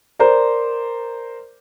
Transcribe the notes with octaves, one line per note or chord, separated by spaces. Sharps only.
A#4 C5 D5 A#5